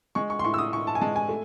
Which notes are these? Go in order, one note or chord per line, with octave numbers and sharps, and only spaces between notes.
G#3 C#6
C#6
C6
A2 C#6
E6
D#6
A2 C#6
A5
G#5
G#3 A5
G#5
A3